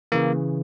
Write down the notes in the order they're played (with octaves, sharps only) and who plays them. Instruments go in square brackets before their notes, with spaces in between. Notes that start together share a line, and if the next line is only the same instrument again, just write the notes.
[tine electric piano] C#3 E3 A#3